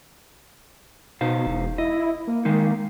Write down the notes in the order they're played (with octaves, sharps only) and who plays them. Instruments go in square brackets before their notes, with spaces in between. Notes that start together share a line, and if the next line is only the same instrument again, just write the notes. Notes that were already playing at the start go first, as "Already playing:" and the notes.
[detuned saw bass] B2 [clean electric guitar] D#4 C5 F5
[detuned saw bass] E1
[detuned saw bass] E4 [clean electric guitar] D#5
[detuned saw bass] A#3
[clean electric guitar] D#3 G#3 D#4